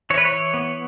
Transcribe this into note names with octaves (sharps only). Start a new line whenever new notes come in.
E3 C#5
B4
C#5
E3
B3